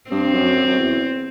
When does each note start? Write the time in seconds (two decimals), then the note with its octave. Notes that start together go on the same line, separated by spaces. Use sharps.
0.10 G2 C4
0.34 F#2
0.56 F#2
0.67 F#2
0.78 E2